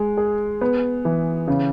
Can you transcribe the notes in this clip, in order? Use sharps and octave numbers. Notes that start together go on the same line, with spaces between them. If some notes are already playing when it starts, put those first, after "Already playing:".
Already playing: G#3
G#4
B3
E3
C#3